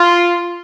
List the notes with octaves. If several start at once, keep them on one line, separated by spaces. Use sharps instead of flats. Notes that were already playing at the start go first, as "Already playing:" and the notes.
Already playing: F4